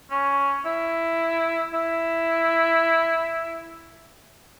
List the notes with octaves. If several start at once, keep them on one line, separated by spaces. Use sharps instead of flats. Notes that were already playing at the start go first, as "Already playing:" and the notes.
C#4
E4
E4